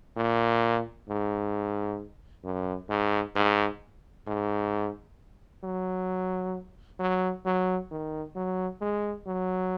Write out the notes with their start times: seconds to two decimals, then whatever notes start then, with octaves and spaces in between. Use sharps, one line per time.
0.16 A#2
1.09 G#2
2.44 F#2
2.89 G#2
3.35 G#2
4.27 G#2
5.63 F#3
7.00 F#3
7.45 F#3
7.91 D#3
8.36 F#3
8.81 G#3
9.27 F#3